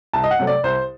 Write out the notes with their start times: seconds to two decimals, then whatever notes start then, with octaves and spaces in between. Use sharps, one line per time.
0.13 C2 A5
0.24 D#5
0.31 F#5
0.39 C3 F#3 A3
0.47 D5
0.64 C2 C5